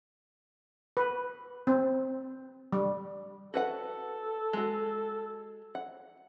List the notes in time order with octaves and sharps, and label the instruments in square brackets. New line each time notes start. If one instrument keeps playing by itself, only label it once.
[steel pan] B4
C4
G3
[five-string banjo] F#4 B4 F#5 [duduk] A4
[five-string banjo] G#3 F#4
F#5